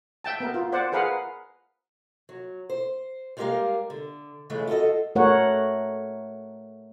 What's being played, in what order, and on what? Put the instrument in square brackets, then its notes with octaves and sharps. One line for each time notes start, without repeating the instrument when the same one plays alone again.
[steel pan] E5 G5 A5
B3 A#4
F4
C5 D5 F#5
G#4 A#4 B4 F5 F#5
[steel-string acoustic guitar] F#3
C5
G3 G#3 A#3 G4 A#4 F5
D3
C#3 E3 G#3 A3
F4 F#4 G#4 A4 D#5
[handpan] A3 A#4 C#5 F#5